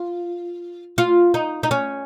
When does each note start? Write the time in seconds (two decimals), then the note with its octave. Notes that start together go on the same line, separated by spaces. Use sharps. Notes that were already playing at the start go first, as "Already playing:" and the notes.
Already playing: F4
0.98 F4
1.34 D#4
1.63 D#4
1.71 C#4